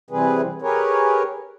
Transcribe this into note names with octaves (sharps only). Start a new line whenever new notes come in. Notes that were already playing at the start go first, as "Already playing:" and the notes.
C3 E3 G3 C4 G#4 B4
G4 G#4 A#4 B4 C#5